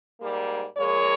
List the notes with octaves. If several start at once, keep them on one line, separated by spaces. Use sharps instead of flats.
G#2 G3 A#3
A#2 F3 G#3 A#4 C#5